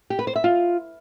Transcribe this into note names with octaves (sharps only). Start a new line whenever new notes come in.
G4
B4
C5
E5
F4